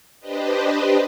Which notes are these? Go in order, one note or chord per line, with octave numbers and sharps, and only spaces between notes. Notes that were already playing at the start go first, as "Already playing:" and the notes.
D4 G4 B4 C5 D#5